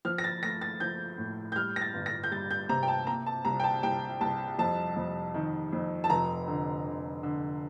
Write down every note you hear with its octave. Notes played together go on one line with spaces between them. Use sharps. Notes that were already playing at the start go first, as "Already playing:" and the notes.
F3 F6
A#6
A6
A3 A#6
A6
F3 G6
A2
G6
G3 F6
A#6
A6
G1
A#6
G6
G3 A6
G6
C3 A#5
G5
A5
A#3 A#5
A5
C2 A#5
G5
A5
C2 G5
C2 A5
F2 A5
F2
D#3
F2
A5
F1 A#5
D3
D3
D3